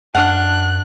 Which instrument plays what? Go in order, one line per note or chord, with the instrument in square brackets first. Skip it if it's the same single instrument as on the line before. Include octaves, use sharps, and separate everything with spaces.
[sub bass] F#2 [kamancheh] D4 F#6 [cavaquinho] F5 F#5 A5